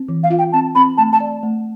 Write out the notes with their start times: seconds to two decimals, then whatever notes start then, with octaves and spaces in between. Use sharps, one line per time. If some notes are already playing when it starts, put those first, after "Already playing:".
Already playing: C4
0.09 E3
0.24 F5
0.30 F4
0.39 G5
0.53 C4 A5
0.75 C4 B5
0.98 A3 A5
1.13 A5
1.20 D5
1.43 A3